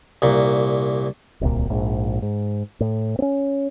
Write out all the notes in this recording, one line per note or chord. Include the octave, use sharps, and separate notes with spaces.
C2 A#2
D1 C2 A#2
A#1 G#2
G#2
A2
C4 C#4